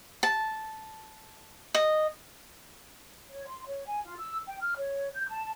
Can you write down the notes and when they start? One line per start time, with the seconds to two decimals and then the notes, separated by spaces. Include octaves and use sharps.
0.23 A5
1.74 D#5
3.28 C#5
3.48 C6
3.66 C#5
3.86 G#5
4.05 F4
4.18 E6
4.47 G5
4.61 F6
4.77 C#5
5.14 G6
5.29 A5